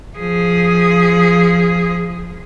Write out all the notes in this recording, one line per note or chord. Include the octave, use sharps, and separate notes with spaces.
F3 G#4